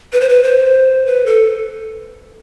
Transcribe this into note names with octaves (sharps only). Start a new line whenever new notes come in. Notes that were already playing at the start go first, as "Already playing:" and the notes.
B4
C5
B4
C5
B4
A4